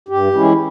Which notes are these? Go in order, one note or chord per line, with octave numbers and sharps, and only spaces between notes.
G2 G4
E3 G#3 C#4 E4